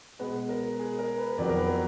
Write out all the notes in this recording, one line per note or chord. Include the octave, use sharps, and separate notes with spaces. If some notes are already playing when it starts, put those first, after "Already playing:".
B2 G#3 B3 B4
A#4
G#4
A#4
B4
B4
F2 D#3 F#3 B3 D5
A#4
B4